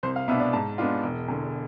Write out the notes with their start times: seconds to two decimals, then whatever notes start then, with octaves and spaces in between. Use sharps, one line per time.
0.03 C2 C5
0.16 F5
0.28 B2 B3 D4 E5
0.40 D5
0.53 G#2 A5
0.78 G#3 B3 D4 F4
1.03 E1
1.28 E2 D3